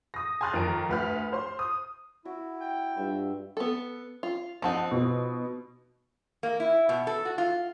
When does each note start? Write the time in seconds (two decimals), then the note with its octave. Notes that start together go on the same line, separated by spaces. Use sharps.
0.14 D#6 A#6
0.41 G#5 A5 C6 F6 F#6 A6
0.53 F2 D#3 A#4 A#5 D7
0.89 D2 B4 F6
1.33 C5 C6
1.59 D#6
2.25 E4 F#4 D6
2.61 G5
2.97 G2 F4 E5
3.57 B3 A4
4.23 F4
4.62 F3 C4 D#4 F#5 A5
4.91 B2
6.43 A#3
6.60 E4
6.89 B2
7.07 A4
7.25 F#4
7.38 F4